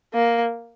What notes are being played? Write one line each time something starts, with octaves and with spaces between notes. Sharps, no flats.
A#3